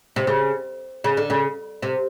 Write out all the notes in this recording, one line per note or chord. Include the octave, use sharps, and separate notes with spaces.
C3
C#3
C#3
D3
C#3
C3